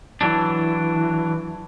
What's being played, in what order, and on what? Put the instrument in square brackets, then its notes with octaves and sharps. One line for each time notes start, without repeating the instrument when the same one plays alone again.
[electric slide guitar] E3 F#3 D4